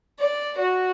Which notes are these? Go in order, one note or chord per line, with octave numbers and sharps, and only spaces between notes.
D5
F#4